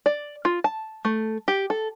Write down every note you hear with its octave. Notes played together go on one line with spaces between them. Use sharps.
D5
F4
A5
A3
G4
A4